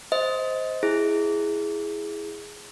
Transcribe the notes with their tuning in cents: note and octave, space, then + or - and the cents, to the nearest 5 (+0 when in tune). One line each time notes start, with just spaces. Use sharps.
C5 +0 D#5 +20
E4 +0 G#4 +0